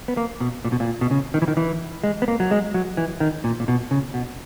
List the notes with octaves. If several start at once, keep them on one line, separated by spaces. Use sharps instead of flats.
B3
A#3
B2
A#2
B2
A#2
B2
C#3
D#3
E3
D#3
E3
G#3
B3
A#3
F#3
G#3
F#3
E3
D#3
A#2
A#2
B2
C#3
B2